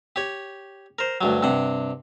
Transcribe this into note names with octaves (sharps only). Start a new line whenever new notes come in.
G4 C#5
A#4 C5
D2 G2 F#3
G2 C3 F#5